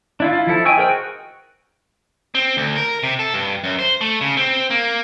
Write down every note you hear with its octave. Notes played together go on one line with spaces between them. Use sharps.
D4 E4 F4
E4 F4
F3 E4 A4
D#5 G5 G#5 C#6 E6
G#4 A#4 C5 G5
F#4
C4
D2
A#4
C3
A4
G2
F#2
C5
A3
C#3
C4
A#3